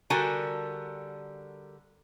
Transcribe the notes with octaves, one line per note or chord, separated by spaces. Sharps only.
D3 G3 F#4 A#4 G#5 A5